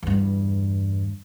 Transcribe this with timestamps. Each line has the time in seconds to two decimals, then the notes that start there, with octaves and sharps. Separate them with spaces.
0.03 E2 G2